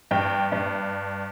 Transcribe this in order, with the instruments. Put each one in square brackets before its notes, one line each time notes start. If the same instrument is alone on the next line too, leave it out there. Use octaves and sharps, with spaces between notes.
[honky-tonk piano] G2 G5
G2